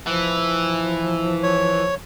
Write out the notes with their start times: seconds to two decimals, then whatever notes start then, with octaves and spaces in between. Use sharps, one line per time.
0.07 E3 F3
1.43 C#5